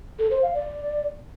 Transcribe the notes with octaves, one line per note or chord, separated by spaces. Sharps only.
A4
C5
F5
D5